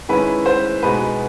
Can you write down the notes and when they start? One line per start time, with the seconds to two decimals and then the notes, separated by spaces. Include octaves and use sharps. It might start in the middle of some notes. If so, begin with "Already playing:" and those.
0.09 D#3 G#3 C#4 E4 B4
0.46 C5
0.83 B2 G#3 B3 D#4 B4